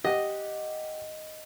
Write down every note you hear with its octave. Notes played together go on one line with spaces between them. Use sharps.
G4 D#5 F#5